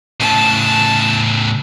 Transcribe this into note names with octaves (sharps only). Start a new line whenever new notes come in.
A2 C#3 A5